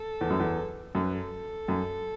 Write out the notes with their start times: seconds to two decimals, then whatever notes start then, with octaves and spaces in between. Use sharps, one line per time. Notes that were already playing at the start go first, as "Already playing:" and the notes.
Already playing: A4
0.21 E2
0.30 F#2
0.40 E2
0.94 F#2 A4
1.04 B4
1.14 A4
1.68 F#2